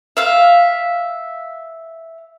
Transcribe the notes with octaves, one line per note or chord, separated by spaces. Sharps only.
E5 F5